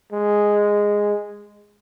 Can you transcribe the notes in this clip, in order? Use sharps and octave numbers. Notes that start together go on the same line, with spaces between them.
G#3